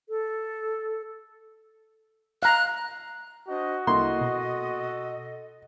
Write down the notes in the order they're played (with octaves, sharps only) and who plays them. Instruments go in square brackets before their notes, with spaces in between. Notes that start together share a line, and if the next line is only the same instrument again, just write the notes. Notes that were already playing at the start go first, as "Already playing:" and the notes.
[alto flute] A4
[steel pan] F5 A#5 [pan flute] F#6
[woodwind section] D4 C5 D#5 [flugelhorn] F#4
[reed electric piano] C2 A#3 E4 [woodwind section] A4 D#5 [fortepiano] C6
[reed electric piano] B2